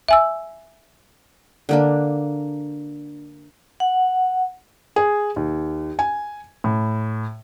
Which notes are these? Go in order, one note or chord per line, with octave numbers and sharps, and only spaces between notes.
E5 G#5 E6
D3 A#3 D4
F#5
G#4
D#2
G#5
A2